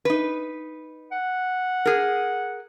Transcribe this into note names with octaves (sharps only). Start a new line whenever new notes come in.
D#4 B4
F#5
G#4 A#4